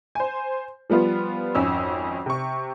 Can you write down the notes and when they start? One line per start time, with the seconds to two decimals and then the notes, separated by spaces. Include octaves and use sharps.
0.15 C5 G#5
0.90 F3 G3 B3 F4
1.55 G#1 F2 C#4 E6
2.26 C3 C#6